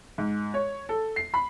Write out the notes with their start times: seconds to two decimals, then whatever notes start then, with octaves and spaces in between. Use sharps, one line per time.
0.18 G#2
0.54 C#5
0.89 A4
1.16 C7
1.34 B5